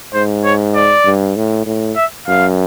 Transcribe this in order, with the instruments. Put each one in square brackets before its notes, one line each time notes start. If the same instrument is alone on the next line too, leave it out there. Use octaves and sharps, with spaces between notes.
[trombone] G#2 [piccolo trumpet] C5
[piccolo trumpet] C#5
D5
[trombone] G2
A2
A2
[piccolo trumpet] E5
[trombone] F#2 [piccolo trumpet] F5